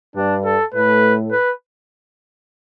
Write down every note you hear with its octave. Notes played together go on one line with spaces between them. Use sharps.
G2 G3 D4
A4
A2 A3 B4
B4